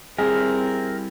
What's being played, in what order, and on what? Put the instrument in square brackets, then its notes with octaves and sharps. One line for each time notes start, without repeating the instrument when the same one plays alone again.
[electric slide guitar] G3 E4 [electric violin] C4 [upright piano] G#4 [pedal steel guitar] A#4